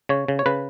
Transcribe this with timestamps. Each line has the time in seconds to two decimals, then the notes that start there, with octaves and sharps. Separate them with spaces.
0.09 C#3 C#5
0.28 C#3
0.39 C#5
0.46 C#3 B4